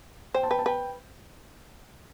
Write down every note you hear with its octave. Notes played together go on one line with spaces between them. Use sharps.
C5 G5
A5
B4 G5
A5
B4 G5